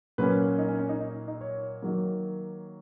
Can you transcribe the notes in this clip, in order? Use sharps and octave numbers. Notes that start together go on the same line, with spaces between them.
A#2 F#3 A#3 C#4 B4
D#4
C#4
C#4
D#4
D#4
D#4
C#5
D#3 F#3 A#3